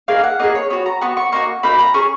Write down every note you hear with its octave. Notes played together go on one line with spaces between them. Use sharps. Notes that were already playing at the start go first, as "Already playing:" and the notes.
A#3 D#4 G#4 F5
F#5
A#3 D#4 G#4 D#5
C#5
B3 F#4 C#5
A#5
B3 F#4 C#6
C#6
A#3 D#4 F#4 C#6
A#3 D#4 F#4 B5
A#5
C#4 G#4 C#6